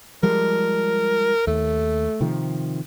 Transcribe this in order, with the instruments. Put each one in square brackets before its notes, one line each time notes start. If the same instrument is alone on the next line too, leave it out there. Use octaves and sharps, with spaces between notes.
[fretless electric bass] F3 G3 G#3 [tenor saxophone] A#4
[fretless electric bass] D#2 [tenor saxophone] A3
[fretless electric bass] C3 D#3 F3